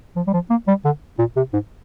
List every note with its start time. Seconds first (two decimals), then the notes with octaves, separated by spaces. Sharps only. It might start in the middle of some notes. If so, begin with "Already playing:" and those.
0.16 F3
0.27 G3
0.34 F3
0.50 A#3
0.68 G3
0.85 D3
1.19 A#2
1.37 C3
1.53 G#2